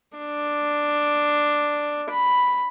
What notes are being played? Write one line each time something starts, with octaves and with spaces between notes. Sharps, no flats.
D4
B5